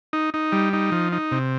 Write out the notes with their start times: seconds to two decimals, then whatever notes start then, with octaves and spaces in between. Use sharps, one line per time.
0.13 D#4
0.34 D#4
0.52 G3
0.73 D#4
0.92 F3
1.13 D#4
1.32 C3